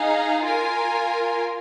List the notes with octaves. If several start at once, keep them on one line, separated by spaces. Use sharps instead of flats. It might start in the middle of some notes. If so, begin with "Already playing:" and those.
Already playing: D#4 G#4 F5
F4 A#4 G#5